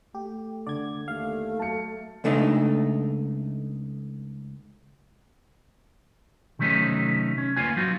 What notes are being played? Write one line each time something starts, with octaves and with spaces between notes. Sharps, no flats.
A3 G4
D3 D5 G#6
D#2 A3 F5
F#3 A5 C#7
C#2 A3 D4 D#4
C3 D#3 F#3 A3 C#4 D#4
C#4
D2 A#3 B3 F4 G#5
F#3 D#4 F4 F#4